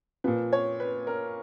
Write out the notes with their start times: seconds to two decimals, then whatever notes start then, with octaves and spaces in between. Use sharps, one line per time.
0.24 A#2 F3 B4
0.52 C#5
0.80 B4
1.07 A#4